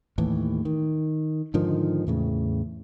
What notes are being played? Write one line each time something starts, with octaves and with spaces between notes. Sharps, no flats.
D#2 A2 E3
D#3
G#2 D3 D#3 F3
E2 A2 C#3